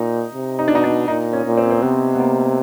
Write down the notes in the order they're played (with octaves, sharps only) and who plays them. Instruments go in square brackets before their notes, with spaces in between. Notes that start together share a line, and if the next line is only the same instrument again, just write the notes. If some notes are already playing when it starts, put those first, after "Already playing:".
Already playing: [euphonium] A#2 [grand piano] D#4
[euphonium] C3
[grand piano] D#4
D4
[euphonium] B2 [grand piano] D#4
[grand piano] D4
[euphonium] A#2 [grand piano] D#4
[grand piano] C#4
[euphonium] A#2
[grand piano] C4
C4
[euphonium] C3 [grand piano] B3
[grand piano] B3
A#3